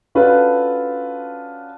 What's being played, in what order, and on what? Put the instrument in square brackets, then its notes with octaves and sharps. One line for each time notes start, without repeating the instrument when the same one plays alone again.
[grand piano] C#4 D4 F4 F#4 A4 B4